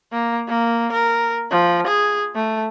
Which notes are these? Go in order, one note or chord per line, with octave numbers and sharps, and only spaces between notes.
A#3
A#3
A#4
F3
G#4
A3